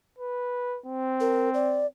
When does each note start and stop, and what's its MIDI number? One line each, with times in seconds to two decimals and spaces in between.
0.18 0.79 71
0.86 1.89 60
1.20 1.49 70
1.54 1.87 74